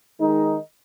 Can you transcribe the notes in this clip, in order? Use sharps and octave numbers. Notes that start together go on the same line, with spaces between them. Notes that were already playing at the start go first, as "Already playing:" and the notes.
D#3 G#3 D#4